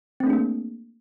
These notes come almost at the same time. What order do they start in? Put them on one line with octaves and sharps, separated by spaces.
C4 A3 D4 G#4 A#3